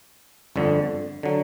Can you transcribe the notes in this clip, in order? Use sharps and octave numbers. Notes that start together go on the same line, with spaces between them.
G1 F2 D3
D3 F#3